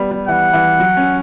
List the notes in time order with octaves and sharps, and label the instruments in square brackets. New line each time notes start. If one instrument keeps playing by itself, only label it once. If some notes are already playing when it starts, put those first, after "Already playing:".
Already playing: [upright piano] G3 B3
G3
[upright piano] E3 [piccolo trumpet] F#5
[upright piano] E3
F#3
C#4